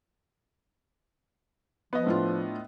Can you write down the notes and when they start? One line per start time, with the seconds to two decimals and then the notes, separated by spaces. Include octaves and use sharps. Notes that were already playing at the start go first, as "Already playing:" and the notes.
1.93 F3 B3 D#5
2.07 A2 D4 F4